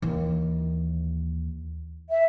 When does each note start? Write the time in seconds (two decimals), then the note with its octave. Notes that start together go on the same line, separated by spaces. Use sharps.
0.02 D#2 E3
2.09 E5